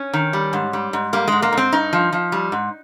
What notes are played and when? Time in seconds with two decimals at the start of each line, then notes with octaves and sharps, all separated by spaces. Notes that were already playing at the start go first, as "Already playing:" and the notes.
Already playing: C#4
0.13 D#3
0.33 G3
0.53 G#2
0.73 G3
0.93 G#2
1.13 G3 A#3
1.28 G#2 G#3
1.42 A#3
1.53 G#2 C4
1.72 G2 D#4
1.93 F3
2.13 F3
2.32 G3
2.52 G#2